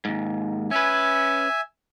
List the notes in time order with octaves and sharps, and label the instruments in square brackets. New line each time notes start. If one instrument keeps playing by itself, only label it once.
[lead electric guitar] D#2 G#2
[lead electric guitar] C#4 B4 [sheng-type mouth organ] E5 G#5